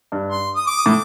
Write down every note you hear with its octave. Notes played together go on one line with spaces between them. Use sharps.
G2
C6
D#6
D6
D#6
A2 D6